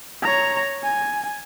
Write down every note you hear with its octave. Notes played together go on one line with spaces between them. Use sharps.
C#5 A#5
G#5